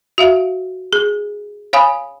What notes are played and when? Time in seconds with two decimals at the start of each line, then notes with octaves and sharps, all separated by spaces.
0.18 F#4 E5 F5
0.93 G#4
1.73 C#5 F5 G#5 B5 D#6